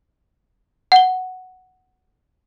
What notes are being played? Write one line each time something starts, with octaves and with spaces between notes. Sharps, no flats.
F#5 G7